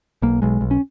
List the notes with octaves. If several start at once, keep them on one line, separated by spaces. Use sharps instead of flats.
B1 A#3
B1 G#3
B1
C#4